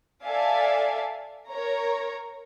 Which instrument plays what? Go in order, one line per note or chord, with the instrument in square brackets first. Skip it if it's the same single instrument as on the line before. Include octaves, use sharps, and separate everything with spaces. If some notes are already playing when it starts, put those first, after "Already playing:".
[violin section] A4 D5 E5 F5 G#5
A#4 C#5 A#5